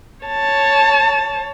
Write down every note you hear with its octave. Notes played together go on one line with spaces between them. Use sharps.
C#5 A5